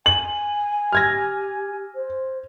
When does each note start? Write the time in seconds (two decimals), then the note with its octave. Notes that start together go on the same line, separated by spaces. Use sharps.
0.06 G#5 F#7
0.93 G4 F6 G#6 A#6
1.95 C5